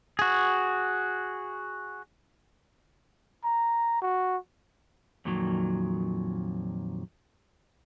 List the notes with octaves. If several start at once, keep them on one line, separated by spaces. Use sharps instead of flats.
F#4 G#4
A#5
F#4
F2 A#2 D#3 F#3